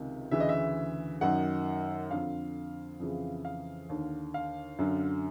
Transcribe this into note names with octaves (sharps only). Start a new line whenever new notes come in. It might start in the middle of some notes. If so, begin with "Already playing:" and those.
Already playing: C#2 C3 D#3
D2 C#3 E3 E5
D#5
E5
F#2 D#3 F#5
F2 D3 F5
F2 C#3 E3
F5
D#2 D3
F5
F#2 D3